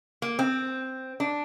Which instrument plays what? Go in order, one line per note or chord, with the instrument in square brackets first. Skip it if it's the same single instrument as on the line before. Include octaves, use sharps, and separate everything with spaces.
[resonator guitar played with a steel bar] A#3
C4
D4